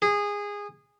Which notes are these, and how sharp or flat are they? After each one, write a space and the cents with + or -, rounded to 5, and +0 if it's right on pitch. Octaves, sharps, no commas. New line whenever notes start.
G#4 -20